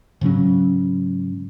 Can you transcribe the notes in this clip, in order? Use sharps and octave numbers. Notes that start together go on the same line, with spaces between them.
G#2 C#3 F#3 C#4